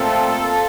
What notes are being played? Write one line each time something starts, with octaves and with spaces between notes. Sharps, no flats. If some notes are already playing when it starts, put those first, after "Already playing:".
Already playing: A#2 A3 C4 F4 A4